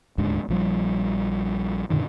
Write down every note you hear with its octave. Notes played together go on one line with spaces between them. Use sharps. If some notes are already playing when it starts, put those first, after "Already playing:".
D#1 D2 G#2 D3
A#1 F3 G3
F#2 A#2 D3 D#3